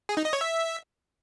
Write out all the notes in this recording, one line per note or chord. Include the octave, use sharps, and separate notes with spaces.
G#4
D#4
D#5
C#5
E5